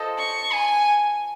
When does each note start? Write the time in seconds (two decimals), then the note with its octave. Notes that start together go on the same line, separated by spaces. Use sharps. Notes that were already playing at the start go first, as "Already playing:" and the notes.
Already playing: F4 A4 C5 D#5
0.18 C#6
0.53 G#5